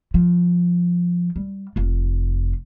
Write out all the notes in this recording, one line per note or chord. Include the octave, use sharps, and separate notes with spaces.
F3
G3
F1 F4